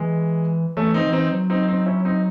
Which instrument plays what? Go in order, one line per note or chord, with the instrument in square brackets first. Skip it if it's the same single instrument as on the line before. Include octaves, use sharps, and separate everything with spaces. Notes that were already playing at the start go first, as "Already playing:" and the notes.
Already playing: [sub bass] E3 [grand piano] G#3
[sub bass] E3 [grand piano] A3 C#4
[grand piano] C4 D#4
[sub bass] E3
[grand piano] C4 D#4
[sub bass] F#3
[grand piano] C4 D#4
C4 D#4
C#4 E4
C4 D#4